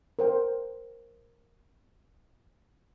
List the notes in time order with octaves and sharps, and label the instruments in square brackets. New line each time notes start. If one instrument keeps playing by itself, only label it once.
[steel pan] A#4 C5 G5